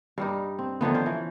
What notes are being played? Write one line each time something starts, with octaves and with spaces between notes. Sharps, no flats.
G2 G3 D#4
C4
D3 D#3 F3 B3
C#4 C5
E3